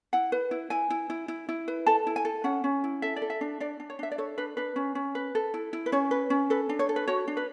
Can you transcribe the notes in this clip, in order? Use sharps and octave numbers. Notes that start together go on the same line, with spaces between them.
E4 F#5
B4
E4
E4 G#5
E4
E4
E4
E4
B4
A4 A5
E4
G#5
A4
C#4 F#5
C#4
E4
A4 E5
D5
A4
E5
D4
D4 D5
D4
C#5
D4 E5
D5
A4 C#5
D4 B4
D4 B4
C#4
C#4
B4
A4
E4
E4
B4
C#4 C#5
B4
C#4
A4 B4
D4
C#5
A4
B4
F#4 C#5
D4
B4